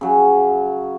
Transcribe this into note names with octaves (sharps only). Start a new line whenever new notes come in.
C#3 F#3